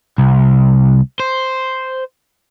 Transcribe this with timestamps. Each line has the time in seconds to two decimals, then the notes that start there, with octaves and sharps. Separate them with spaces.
0.18 C2
1.20 C5